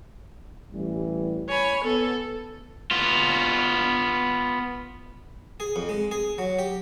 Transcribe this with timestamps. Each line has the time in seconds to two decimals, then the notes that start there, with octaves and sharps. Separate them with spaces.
0.72 A1 E3 G3
1.48 C#5 G#5 B5
1.84 B3 A4
2.91 B3 F4
5.60 G#4
5.76 F2
5.89 G#3
6.11 G#4
6.38 F#3
6.59 G4